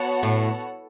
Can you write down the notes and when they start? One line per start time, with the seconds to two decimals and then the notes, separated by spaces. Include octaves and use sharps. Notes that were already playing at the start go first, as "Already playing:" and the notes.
Already playing: B3 F#4 C#5 F#5 A5
0.23 A2